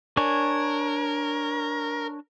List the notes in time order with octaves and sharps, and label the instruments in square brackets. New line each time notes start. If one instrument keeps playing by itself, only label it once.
[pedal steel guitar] D4 C#5 G#5 [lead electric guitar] A#4